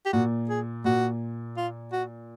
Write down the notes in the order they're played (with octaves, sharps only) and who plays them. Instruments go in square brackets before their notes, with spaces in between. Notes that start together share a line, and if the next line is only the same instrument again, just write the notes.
[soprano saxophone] G4
[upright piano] A#2 [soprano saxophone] F#4
[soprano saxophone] G#4
[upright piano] A#2 [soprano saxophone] F#4
[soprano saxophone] F4
F#4